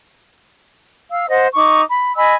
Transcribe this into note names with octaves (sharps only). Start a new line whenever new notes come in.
F5 E6
C5 D#5 F#5
D#4 C#6 D6
B5
D#5 G#5 B5 E6